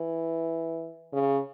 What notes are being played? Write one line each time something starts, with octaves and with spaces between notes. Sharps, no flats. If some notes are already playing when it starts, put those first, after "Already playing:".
Already playing: E3
C#3